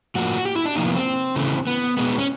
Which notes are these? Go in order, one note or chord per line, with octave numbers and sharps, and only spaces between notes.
A2 F3 A#3 F#4
G4
E4
D4
C3 F3 A#3 D#4
B3
C4
C#3 E3 A3
B3
B2 G#3 B3
C#4